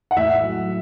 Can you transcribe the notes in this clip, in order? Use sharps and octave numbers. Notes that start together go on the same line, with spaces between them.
F#5
A2 E5
F#3